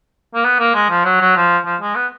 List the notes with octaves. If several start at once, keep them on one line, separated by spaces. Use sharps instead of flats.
A#3
B3
A#3
G#3
F3
F#3
F#3
F3
F3
G#3
B3